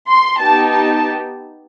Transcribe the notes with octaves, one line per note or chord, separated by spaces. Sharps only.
C6
B3 D#4 G4 A5
A5